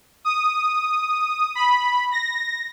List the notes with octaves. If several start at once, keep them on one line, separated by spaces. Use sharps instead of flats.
D#6
B5
A#6